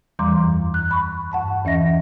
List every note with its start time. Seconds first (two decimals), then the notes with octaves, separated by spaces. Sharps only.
0.19 E2 E3 G3 A#5 C6 D6
0.44 F#2
0.74 F#6
0.91 B5 C#6
1.32 G2 F#5 A5 C#6
1.65 E2 E3 C#4 D#5 E5 A#6